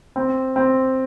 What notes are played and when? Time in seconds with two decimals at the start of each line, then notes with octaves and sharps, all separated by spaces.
0.16 C4
0.56 C4